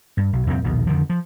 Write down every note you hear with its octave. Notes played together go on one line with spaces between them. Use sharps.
G2
B1
C2 F2 A#2 C4
A#1 D#2 B2
F2 D3 D#3 F3
F3